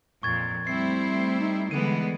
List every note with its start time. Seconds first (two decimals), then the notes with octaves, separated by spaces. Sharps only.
0.23 F2 A#2 C#6 G#6 A6
0.67 G3 A3 C4 E4 C5 C7
1.40 D#4
1.71 D3 E3 G3 G#3 B3 D#7